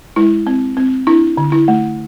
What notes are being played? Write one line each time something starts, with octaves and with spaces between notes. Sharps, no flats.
G#3 E4
C4
C4
D4 E4
D3
E4
A3